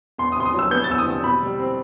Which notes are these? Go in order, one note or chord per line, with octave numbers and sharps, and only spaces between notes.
E2 C6
D#6
C3 C6
D#6
F#3
E6
B3 G6
A6
E2 E6
D#6
C3
B2 B5
G3
C4